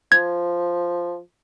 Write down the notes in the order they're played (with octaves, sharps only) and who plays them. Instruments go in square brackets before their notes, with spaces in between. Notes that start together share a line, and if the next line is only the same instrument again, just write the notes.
[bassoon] F3 [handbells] G#6